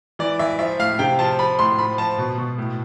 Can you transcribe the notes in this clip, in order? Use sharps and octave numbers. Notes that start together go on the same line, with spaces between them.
E3 D5
E3 E5
F3 E5
A2 F5
C3 G5
F3 A5
F3 B5
A2 C6
F3 B5
F3 A5
B2
B2
A2